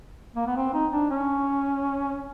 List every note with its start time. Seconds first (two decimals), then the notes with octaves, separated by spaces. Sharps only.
0.36 A#3
0.47 B3
0.56 C4
0.74 D#4
0.92 D4
1.10 C#4